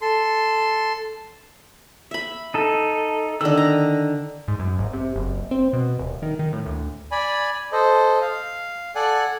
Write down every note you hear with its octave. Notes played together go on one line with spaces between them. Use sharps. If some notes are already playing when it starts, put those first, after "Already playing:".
A4 C6
E5 B5
D#4 A4
D3 D#3 E6
A#5
G#2
F#2
G#1
C3
F#1
C4
B2
D#1
D#3
D#3
A2
D2
D5 G#5 B5
A4 C5 D#5
F5
A4 D5 F#5 G#5 F#6